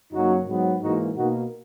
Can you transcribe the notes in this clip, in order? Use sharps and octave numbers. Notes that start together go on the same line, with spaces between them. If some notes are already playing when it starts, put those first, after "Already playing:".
F#2 C#3 F#3 A#3 D#4 F#4
G#2 F#3 B3
G#2 E3 A#3 D#4 F#4
B2 A#3 D#4 F#4